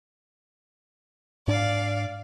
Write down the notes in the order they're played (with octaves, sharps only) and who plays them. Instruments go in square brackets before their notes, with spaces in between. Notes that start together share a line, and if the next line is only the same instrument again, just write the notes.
[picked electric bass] G#2 D4 [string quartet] D5 F5